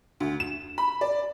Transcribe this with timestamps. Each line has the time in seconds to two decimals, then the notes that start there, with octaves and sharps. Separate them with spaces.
0.20 D2
0.40 E7
0.78 B5
1.01 D5